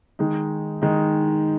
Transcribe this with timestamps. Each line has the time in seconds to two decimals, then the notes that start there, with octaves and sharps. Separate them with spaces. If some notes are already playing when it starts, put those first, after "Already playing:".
0.19 D#3 G#3 D#4
0.82 D#3 G#3 D#4